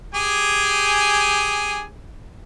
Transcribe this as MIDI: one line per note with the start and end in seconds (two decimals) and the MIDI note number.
0.15 1.84 67
0.15 1.84 68
0.15 1.84 80